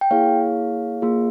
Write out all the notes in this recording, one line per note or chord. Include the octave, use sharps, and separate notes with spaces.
G5
A#3 E4 G#4 C#5 F5
A#3 F4 G#4